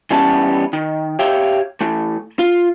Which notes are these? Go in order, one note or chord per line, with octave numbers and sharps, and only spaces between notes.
E3 G3 B3 C#4 A5
D#3
G4 C#5 E5 F5 G5
E3 A3
F4